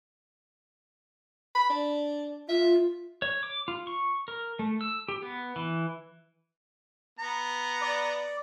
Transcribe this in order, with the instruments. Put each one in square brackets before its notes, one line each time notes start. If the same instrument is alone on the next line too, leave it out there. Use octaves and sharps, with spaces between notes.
[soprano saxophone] B5
D4
[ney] F4 [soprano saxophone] E5
[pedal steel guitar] C#5
D6
F4
C#6
A#4
A3
E6
G4
B3
E3
[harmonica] B3 A#5
[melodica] D5